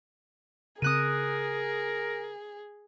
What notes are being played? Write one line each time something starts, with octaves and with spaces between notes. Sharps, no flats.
C#3 C4 G#4 A#4 D#6 F#6 D#7